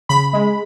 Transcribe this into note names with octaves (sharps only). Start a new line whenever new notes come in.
C#3 B5
G#3